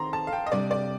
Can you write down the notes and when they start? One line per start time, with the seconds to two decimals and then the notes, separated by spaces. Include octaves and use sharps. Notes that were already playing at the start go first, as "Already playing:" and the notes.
Already playing: D#3 C4 A#5 C6
0.13 A5
0.27 F5
0.33 G5
0.47 D#5
0.52 C3 G3 D4 D5
0.71 D5